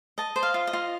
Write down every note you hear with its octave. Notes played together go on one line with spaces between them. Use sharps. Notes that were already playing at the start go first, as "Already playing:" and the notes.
D#5 A5
C5
F5
F4
D#5
F4